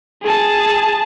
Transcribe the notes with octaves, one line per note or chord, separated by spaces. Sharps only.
G#4 A5